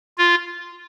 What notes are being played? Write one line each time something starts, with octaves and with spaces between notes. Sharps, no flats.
F4